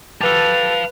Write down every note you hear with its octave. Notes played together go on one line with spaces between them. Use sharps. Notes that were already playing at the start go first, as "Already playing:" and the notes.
G4 A4 B4 F5 A5 F7